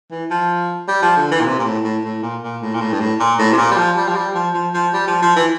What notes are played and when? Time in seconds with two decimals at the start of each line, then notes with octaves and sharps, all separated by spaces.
0.11 E3
0.31 F3
0.88 G3
1.02 F3
1.17 D3
1.31 E3
1.40 A#2
1.46 C3
1.59 A#2
1.65 A2
1.84 A2
2.04 A2
2.23 A#2
2.43 A#2
2.62 A2
2.74 A#2
2.81 A2
2.93 G2
3.00 A2
3.20 A#2
3.39 A2
3.53 C3
3.58 A#2
3.71 G3
3.77 F3
3.97 G3
4.08 F3
4.16 G3
4.35 F3
4.54 F3
4.74 F3
4.93 G3
5.08 F3
5.22 F3
5.36 E3